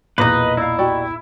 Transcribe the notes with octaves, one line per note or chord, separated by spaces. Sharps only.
B1 E2 A#2 A#3 D#4 B4 D#5
E4 D5 F5
F#4 G4 D5